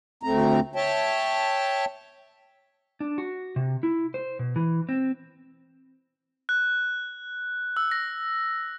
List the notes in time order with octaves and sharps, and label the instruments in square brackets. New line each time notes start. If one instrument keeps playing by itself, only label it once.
[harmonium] D2 A3 C4 A#5
C#5 E5 G5 A5
[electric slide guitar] D4
F#4
C3
E4
C5
B2
E3
C4
[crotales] F#6
E6
A#6